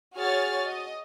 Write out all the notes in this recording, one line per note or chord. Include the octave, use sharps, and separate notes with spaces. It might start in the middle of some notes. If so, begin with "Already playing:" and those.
F#4 G#4 C#5 C#6 F6 A6
D#5